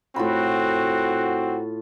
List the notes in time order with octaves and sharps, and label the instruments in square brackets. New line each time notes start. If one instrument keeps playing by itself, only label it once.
[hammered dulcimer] A2 F4 B5 [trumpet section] C4 F#4